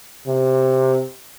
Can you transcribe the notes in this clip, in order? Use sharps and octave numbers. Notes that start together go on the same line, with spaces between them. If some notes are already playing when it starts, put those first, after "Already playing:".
C3